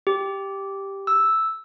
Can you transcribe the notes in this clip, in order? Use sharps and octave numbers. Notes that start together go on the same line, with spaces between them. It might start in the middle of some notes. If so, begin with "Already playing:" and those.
G4
E6